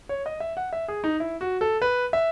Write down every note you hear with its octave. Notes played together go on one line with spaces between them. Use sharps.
C#5
D#5
E5
F#5
E5
G#4
D#4
E4
F#4
A4
B4
E5